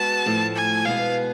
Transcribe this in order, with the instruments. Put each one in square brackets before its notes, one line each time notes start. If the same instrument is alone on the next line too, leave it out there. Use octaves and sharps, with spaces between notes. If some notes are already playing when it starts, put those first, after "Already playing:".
Already playing: [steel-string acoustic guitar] G#3 B3 F#4 [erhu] A5
[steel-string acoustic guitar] A2 F3 A3
[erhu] G#5
[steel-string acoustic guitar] B2 G#3 B3 [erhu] F5